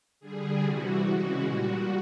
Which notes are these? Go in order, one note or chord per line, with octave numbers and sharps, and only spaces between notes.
D3 G3 G#4
C3 E3 G3 F#4
C#3 E3 G#3
A#2 G3